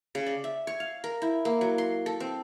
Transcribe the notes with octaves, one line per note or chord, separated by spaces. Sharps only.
C#3
D5
E5
C#5
F5
A#4
E4
A#3
F#3
C6
A4
C4